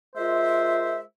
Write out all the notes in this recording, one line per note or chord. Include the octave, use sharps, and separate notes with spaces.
G#3 F4 A#4 C5 E5